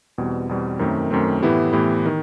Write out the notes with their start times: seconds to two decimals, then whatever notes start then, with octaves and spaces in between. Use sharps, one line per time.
0.18 E2 B2 G3 C4
0.49 E2 B2 G3 C4
0.79 F#2 D#3 A3 C4
1.11 F#2 D#3 A3 C4
1.43 A2 E3 B3 E4 G4
1.72 A2 E3 B3 E4 G4
2.06 D#3